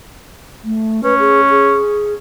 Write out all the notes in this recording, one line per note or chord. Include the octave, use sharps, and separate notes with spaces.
A3
C#4 B4
G#4
G#4